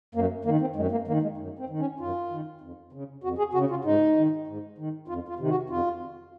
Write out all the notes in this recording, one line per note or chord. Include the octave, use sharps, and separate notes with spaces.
F#2 A#3
D#3 A#3
C4
F#2 G#3
A#3
D#3 A#3
G#3
F#2
C4
D#3
C#4
F#2 F4
D#3
F2
C#3
F2 F#4
G#4
C#3 F#4
F4
G#2 D#4
D#3
G#2
D#3
F2 F4
F4
C3 D#3
F#4
F2 F4